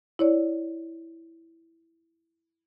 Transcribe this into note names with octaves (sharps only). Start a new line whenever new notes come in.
E4 C#5 D5